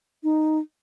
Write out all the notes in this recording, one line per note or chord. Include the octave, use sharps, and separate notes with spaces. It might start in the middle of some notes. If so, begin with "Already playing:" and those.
D#4